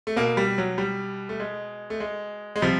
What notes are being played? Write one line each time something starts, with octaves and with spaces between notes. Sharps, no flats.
A3
B2 A#3
G3
F#3
G3
A3
G#3
A3
G#3
G#3
C3 F3 G3